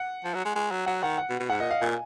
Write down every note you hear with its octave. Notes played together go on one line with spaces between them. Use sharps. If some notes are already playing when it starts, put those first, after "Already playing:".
Already playing: F#5
F3
F#3
G#3
G#3
F#3
F#3 F#5
D#3 F#5
F#5
B2
B2
G#2 F#5
A#2 D#5
F5
A#2 G#5